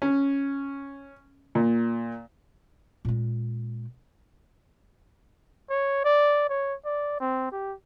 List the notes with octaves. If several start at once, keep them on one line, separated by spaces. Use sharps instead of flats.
C#4
A#2
A#2 G#3
C#5
D5
C#5
D5
C4
G4